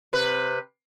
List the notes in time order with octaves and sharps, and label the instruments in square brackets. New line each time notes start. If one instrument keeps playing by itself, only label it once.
[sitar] C3 B4